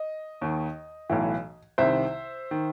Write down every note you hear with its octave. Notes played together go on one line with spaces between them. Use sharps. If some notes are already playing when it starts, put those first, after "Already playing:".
Already playing: D#5
D#2 D#3
B1 A2 E3
C2 C3 D#3 C5 E5
D#3